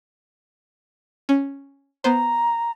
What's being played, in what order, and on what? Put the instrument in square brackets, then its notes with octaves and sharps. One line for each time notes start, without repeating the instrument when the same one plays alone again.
[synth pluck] C#4
[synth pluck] B3 C5 [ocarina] A#5